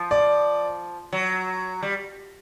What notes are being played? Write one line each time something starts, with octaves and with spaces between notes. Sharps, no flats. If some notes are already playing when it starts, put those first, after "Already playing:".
Already playing: F3
D5
F#3
G3